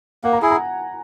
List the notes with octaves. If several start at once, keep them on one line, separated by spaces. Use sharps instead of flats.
A#3 F#5
A#5
E4 G#4 G#5
A#5